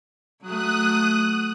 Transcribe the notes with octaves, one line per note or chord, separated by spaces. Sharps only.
F#3 A3 D#6 F#6